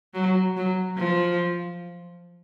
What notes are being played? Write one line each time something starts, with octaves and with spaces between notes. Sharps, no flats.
F#3
F#3
F3